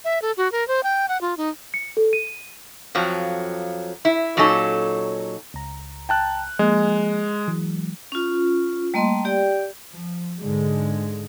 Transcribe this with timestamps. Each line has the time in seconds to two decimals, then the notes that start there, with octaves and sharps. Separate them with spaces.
0.05 E5
0.22 A4
0.37 F#4
0.52 A#4
0.68 C5
0.83 G5
1.09 F#5
1.21 F4
1.37 D#4
1.74 C#7
1.97 A4
2.13 D#7
2.95 F2 F3 F#3
4.05 E4
4.37 A#2 F#3 C#4 D#4 A4
5.54 C#2 A#5
6.09 G5 A5 F#6
6.59 F3 G#3 A#3
7.48 E3 F#3 G#3
8.12 C#4 F4
8.94 G3 A3 A#3 D#5 C6
9.25 G4 D5 G5
9.93 F3
10.43 G#2 D3 G#3